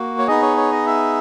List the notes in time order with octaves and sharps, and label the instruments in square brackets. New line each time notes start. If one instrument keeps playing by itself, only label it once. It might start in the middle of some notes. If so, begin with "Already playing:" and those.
Already playing: [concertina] A#3 F#4
C#5
B3 D#4 G#4 D#5
C#5
C#5
D#5
E5